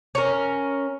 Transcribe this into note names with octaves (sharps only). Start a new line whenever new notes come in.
C#4 A#4